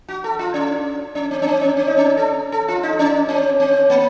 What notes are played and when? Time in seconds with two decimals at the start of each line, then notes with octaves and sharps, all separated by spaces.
0.08 F#4
0.24 A4
0.39 F4
0.54 C#4
1.15 C#4
1.31 C4
1.42 C#4
1.47 C4
1.61 C#4
1.77 C4
1.87 D#4
1.98 C#4
2.17 A4
2.52 A4
2.68 F4
2.83 D#4
2.99 C#4
3.29 C4
3.60 C4
3.90 A#3